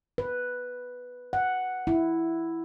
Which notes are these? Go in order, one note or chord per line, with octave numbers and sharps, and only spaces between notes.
B4
F#5
E4